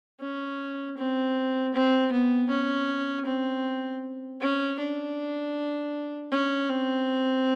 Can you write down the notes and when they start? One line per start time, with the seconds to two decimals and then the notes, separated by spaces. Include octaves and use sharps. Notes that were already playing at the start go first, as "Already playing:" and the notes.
0.20 C#4
0.97 C4
1.74 C4
2.12 B3
2.50 C#4
3.26 C4
4.41 C#4
4.79 D4
6.31 C#4
6.69 C4